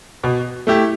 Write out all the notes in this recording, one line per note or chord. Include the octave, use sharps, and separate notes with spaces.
B2
A3 E4 G4